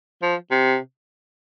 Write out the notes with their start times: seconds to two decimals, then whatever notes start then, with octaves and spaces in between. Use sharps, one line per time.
0.22 F3
0.51 C3